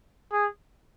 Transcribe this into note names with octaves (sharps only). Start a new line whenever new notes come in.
G#4